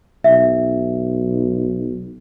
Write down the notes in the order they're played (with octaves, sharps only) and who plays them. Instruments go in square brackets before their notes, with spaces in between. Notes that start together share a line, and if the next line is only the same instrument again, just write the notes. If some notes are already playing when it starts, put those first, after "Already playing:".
[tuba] B1 [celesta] E5